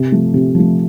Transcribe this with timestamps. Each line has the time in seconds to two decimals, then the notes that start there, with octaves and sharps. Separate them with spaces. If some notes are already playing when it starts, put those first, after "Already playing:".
Already playing: C3
0.12 F3 A3
0.34 C3
0.55 F3 A3